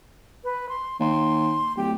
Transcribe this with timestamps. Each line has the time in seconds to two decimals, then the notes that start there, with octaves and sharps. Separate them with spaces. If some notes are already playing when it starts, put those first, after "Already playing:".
0.44 B4
0.69 C6
1.00 D#2 C6
1.77 D1 G4